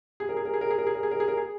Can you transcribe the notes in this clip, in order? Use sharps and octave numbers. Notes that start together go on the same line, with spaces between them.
G#4
A#4
G#4
A#4
G#4
A#4
G#4
A#4
G#4
A#4
G#4
A#4
G#4
A#4
G#4